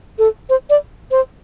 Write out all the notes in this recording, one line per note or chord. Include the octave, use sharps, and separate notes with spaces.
A4
C5
D5
C5